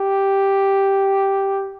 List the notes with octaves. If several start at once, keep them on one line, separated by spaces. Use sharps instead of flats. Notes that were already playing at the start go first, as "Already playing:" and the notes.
Already playing: G4